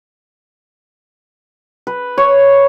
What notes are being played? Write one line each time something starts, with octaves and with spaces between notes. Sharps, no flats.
B4
C#5